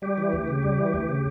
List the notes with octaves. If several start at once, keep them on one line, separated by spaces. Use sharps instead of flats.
G3 G4
E3
D2
C#3
G3
E3
D2
C#3